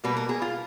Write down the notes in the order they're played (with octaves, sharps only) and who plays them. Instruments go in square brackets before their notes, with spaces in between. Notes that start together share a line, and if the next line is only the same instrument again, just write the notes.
[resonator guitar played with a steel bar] B2 G3 A#3 B4
A#4
G#4
F4